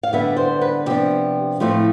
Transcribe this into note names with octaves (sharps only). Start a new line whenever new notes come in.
F5
D3 G3 B3 E5
C5
B4
C3 F3 B3 D4 G4
A2 F3 A3 C4 F4